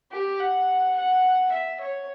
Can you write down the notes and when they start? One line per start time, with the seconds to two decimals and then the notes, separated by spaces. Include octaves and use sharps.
0.11 G4
0.39 F#5
0.96 F#5
1.52 E5
1.80 C#5